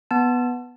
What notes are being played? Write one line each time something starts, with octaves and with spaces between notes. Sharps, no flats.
B3 A5